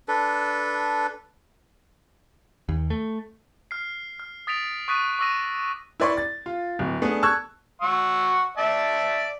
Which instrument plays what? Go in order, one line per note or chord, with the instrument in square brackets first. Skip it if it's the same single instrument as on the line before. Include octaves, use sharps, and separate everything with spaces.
[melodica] D4 A4 B4
[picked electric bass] D#2
A3
[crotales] F6 C7
F6
D#6 A6 B6 D7 F7
C#6 D#6 F#6 A6 B6 D#7
C#6 D6 E6 A#6 D#7
[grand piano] E4 B4 D5 C6 C#6
A6
F4
D1
A3 B3 D4 G#4
A5 C#6 E6 F#6 G#6
[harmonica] F#5 C#6 E6
D5 E5 A5